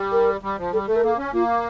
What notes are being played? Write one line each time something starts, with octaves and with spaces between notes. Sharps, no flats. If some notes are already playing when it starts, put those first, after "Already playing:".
Already playing: G3
A#4
G3
F3
G3 A4
A3 A4
A#4
A#3 A4
C#4
A#3 F4